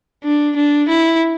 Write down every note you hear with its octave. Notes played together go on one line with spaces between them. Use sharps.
D4
D4
E4